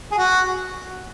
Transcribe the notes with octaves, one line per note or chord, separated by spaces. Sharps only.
G#4
F#4